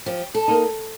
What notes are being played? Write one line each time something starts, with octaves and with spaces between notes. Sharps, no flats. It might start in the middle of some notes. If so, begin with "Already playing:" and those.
F3 G4
A4
A#3 D#4